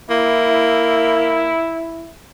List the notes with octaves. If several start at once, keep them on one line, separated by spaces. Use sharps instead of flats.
A#3 E4